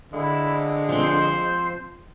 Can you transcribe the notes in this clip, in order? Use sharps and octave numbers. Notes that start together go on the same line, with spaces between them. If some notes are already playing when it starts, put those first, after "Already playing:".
D3 G#3 E4
F3 C4 C5